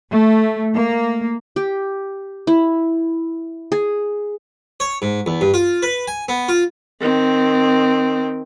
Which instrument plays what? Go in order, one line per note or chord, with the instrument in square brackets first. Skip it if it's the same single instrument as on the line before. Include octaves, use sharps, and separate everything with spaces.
[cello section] A3
A#3
[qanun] G4
E4
G#4
[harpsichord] C#5
G#2
E2
G2
F4
B4
G#5
B3
F4
[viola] D#3 C4